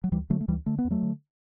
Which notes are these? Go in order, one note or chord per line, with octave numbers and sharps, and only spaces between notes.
F#3
D2 E3 G3
D3 F#3 A3
A3
D2 E3 G3
D3 A3
B3
E2
F#3 A3
D3